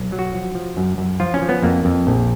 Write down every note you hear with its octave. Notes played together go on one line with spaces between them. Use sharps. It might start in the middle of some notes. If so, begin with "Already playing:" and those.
Already playing: B1
F#3
F#4
F3
F3
F#2
F#2
F3 F4
C#4
F3
B3
F2 A#3
F2
A#1